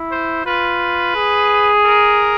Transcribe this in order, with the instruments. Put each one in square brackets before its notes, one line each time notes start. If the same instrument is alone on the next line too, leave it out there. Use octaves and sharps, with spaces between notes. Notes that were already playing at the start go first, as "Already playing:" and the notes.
Already playing: [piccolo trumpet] E4
[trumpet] C5
[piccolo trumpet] F4 [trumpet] B4
[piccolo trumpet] G#4
[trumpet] A#4